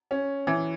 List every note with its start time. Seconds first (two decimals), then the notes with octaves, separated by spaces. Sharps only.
0.11 C#4
0.47 E3